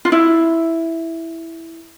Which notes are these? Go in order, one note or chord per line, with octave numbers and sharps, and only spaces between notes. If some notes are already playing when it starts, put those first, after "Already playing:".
F4
E4